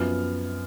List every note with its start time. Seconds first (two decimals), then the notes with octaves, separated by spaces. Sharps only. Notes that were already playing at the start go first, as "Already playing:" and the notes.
Already playing: F#2 F3 B3 F6